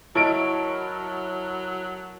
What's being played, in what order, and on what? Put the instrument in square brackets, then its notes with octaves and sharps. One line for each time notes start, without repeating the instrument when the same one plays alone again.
[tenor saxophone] F#3 [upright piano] E4 D7 [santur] A4 A#4 C#5 [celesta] D#5 A5